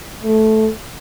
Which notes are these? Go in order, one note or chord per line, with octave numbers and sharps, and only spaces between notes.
A3